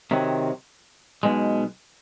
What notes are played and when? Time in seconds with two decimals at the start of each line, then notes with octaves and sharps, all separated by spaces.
0.11 C3 D#3 F#3
1.23 B1 B2 G#3